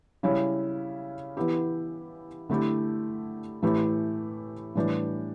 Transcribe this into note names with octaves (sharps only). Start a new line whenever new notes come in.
C#3 G3 C#4 E4
E3 B3 E4 G4
D3 A3 E4 G4
A2 E3 A3 E4 G4
A2 E3 G3 D4 G4